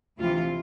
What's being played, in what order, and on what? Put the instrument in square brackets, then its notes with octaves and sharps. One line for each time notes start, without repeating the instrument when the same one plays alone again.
[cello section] D2 C3 E3 F4